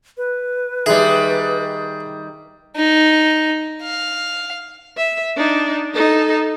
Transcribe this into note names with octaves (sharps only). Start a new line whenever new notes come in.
B4
D#3 G3 G#4 E5 C6
D#4
F5
E5
D4 D#4
D#4 A4